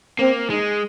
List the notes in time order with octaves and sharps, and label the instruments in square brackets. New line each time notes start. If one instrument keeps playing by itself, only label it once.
[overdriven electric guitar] A#3 [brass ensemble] C4
[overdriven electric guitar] G#3 [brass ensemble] D#4